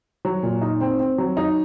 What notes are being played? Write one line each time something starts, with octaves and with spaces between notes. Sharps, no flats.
F#3
A#2
D#4
C4
C4
F#3
D#4